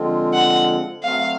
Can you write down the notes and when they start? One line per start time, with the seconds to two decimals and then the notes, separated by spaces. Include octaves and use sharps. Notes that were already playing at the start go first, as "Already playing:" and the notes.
Already playing: D3 F3 G#3 C4 F4
0.34 F#5
1.03 F#3 A3 C4 F5